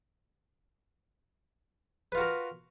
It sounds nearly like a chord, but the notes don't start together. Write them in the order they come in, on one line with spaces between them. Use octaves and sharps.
B4 F4 F#4 A#4